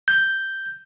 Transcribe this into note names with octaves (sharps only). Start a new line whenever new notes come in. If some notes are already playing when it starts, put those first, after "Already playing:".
G6